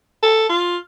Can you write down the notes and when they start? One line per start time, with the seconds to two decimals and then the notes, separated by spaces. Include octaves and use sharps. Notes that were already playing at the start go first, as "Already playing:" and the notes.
0.23 A4
0.49 F4